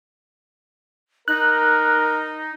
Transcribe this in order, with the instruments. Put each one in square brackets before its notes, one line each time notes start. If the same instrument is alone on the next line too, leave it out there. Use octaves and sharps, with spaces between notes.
[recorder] D#4 [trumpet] A#4 [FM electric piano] F#6